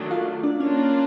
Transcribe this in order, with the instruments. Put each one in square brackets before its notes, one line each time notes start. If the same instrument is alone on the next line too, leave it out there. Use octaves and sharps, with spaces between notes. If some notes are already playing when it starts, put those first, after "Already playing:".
Already playing: [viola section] D#3 F#3 A3 D4
[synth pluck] F4 F5
D4 D5
[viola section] A#3 D4 F4 A#4 [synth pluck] C#4 C#5